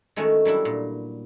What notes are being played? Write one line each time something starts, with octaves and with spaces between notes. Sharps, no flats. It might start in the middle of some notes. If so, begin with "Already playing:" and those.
D#3 G#3 A3 C#4 F#4
F#3 G3 D4 E4
A#2